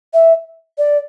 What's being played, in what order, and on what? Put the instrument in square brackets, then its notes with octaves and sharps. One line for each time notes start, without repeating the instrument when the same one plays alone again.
[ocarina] E5
D5